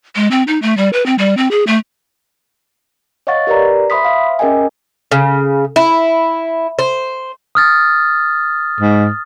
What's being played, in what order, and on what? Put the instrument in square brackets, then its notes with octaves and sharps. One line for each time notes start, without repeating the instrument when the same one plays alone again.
[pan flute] G#3
C4
D#4
A3
G3
B4
C4
G3
C4
G#4
A3
[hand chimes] C#5 D#5 F5 F#5 C#6 A6
G4 A#4 B4 D5 A#5
C5 E5 B5 C6 D#6 B6
E5 F5
C#4 G#4 A#4 D#5 G5 G#5
[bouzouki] C#3
E4
C5
[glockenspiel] D#6 F6 A6
[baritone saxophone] G#2